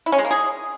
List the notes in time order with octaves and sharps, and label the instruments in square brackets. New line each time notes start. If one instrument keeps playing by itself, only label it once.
[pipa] E4
C#4
G#3
A#3
G#4